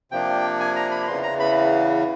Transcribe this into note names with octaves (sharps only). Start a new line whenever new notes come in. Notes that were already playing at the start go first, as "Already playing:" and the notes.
C3 F3 A#3 D4 G5
G#5
A#5
B5
E2 C#3 E3 C6
A#5
B5